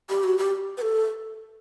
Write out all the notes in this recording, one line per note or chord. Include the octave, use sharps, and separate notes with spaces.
G4
F#4
G4
B4
A4